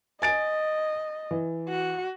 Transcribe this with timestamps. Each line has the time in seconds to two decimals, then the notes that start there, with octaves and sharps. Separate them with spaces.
0.22 D#5 G#5 A6 D7
1.31 E3
1.69 F#4